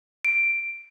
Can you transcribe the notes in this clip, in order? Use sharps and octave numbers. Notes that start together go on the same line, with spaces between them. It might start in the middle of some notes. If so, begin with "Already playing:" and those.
D7